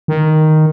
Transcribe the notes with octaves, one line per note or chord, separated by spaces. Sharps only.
D#3